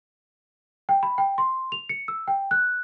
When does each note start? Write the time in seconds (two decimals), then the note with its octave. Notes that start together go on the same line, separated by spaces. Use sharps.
0.89 G5
1.03 B5
1.18 G5
1.38 C6
1.72 F7
1.89 C#7
2.08 E6
2.28 G5
2.51 F#6